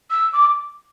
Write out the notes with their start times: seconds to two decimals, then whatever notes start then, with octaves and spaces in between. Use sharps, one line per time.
0.11 E6
0.33 D6